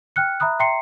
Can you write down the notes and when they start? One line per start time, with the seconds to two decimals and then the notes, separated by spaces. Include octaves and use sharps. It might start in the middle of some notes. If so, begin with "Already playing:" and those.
0.16 G5 F6 F#6 C#7
0.40 E5 A#5 B5 D#6 F#6
0.59 E5 G5 A#5 C6 C7 C#7